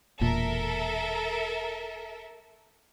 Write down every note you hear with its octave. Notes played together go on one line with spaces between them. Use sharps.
E1 A#2 A4 A#4 E5